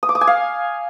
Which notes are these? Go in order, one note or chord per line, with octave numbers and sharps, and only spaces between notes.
D#6
D6
D#6
G#5
F5